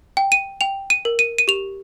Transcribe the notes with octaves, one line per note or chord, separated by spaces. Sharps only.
G5
D#7
G5 F7
D#7
A#4
D#7
D#7
G4 F7